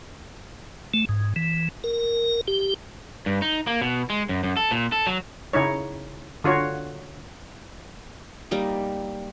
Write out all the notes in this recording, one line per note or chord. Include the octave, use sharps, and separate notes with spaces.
A3
G#2
E3
A#4
G4
G2
D#4
A#3
B2
G#3
F#2
F#2
A4
A#2
A4
F#3
C#3 D#4 E4 C#5
D3 F4 F#4 C#5
G3 A#3 D#4